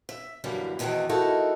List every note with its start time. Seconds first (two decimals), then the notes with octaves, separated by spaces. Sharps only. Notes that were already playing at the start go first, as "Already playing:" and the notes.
0.09 E5
0.44 F#2 D3 E3 G3 A#3
0.79 E2 B2 D#3 E3 A3 C4
1.09 G#3 D#4 E4 F#4 A4 A#4